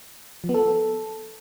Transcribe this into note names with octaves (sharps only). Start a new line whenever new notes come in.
F3
B3
A4